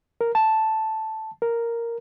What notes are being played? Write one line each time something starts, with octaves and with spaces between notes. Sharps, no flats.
A#4
A5
A#4